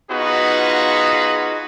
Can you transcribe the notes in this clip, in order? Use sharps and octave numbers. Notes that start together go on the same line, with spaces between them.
B3 D#4 F4 F#4 G#4 B4